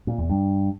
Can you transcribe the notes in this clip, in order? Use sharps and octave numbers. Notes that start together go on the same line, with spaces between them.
A#2
E2
G2